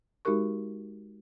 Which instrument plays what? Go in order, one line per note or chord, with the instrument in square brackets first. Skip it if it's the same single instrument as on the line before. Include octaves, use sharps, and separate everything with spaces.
[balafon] G#3 D#4 F#4 G4 A#4 C#6